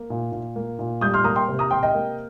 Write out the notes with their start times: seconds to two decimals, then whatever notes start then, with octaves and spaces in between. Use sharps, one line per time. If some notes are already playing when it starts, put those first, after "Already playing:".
Already playing: A#3
0.10 A#2
0.32 A#2
0.56 A#3
0.79 A#2
1.01 G3 D#6 G6
1.14 C6 F6
1.24 A#3 A#5 D#6
1.36 G5 C6
1.48 C3
1.59 A#5 D#6
1.71 C3 G5 C6
1.83 D#5 G5
1.94 A#3